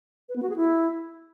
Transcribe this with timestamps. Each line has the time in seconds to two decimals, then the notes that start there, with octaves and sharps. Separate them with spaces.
0.29 B4
0.36 B3
0.43 F#4
0.49 G#4
0.56 E4